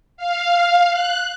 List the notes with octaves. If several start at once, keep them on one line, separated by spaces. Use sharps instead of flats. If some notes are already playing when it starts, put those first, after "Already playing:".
F5
F#6